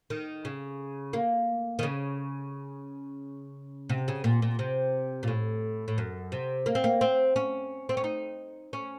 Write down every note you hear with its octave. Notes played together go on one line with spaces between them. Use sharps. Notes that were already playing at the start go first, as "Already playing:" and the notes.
D#3
C#3
A#3
D#3
C#3
C3
C#3
A#2
A#2
C3
A#2
A2
A2
F#2
C3
A#3
C4
A#3
C4
C#4
C4
C#4
D#4
C#4